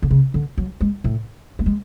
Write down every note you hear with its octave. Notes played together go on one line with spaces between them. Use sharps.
D3
C#3
D3
F#3
G#3
A2
A3
G#3